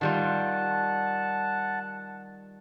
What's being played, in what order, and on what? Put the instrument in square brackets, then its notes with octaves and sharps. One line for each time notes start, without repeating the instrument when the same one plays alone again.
[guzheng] D#3 G3 F4 [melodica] F#5 A5